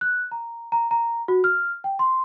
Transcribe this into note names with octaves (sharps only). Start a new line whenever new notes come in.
F#6
A#5
A#5
A#5
F#4
F6
G5
C6